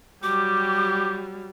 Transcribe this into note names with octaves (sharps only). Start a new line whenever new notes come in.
F#3 G3 G4 D6